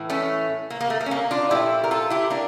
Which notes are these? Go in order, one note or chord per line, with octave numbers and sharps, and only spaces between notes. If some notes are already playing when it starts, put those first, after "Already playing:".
Already playing: A2 E3
A3 C#4
A#3
A#3
A3
A#3
C#4
A#3
D4 F4
A#2 F3 A3 E4 G4
A#4
F4 A4
E4 G4
A#3 D4